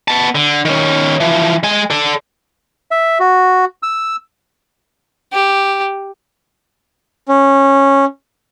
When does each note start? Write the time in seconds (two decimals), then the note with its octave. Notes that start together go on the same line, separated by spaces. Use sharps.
0.08 B3 A5
0.35 D3
0.65 D#3 C#4
1.20 E3 F3
1.63 G#3 G#5
1.90 A4 D5
2.91 E5
3.20 F#4
3.83 E6
5.33 G4
7.28 C#4